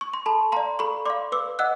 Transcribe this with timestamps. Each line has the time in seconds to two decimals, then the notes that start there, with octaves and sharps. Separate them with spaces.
0.01 C#6
0.14 C6
0.26 A4 A5 B5
0.52 D5 F5 A#5 C6
0.79 A4 B5 C#6
1.06 D5 F5 C6 D6
1.32 B4 D6 E6
1.59 D#5 F#5 E6 F#6